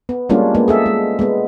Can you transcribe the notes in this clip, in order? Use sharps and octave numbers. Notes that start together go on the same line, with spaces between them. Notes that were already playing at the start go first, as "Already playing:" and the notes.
B3
G3 G#3 A#3 C#4 D4 F4
G#3 A#3 B3
G#4 A4 E5
G#3
G#3 B3